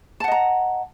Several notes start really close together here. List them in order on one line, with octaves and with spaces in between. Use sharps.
A5 F#5 D#5 A#5